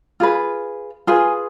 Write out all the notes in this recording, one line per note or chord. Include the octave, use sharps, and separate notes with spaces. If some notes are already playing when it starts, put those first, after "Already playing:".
F4 G#4 B4
F4 G#4 B4 G#5